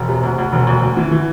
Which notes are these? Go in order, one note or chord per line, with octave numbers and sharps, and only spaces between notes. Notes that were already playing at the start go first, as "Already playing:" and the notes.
Already playing: E1
C3
D2
D2
E1
D2
D2
E3
E3